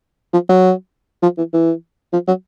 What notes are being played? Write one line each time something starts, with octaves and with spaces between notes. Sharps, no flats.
F3
F#3
F3
E3
E3
F3
F#3